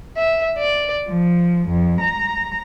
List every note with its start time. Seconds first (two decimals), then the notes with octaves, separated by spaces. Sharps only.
0.17 E5
0.58 D5
1.09 F3
1.69 F2
2.00 A#5